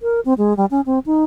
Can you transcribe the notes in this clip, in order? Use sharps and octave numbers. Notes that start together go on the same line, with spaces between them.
A#4
C4
G#3
G3
C#4
C4
D#4